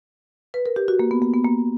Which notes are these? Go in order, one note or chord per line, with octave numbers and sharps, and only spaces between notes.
B4
A#4
G4
F#4
A#3
B3
A#3
B3
A#3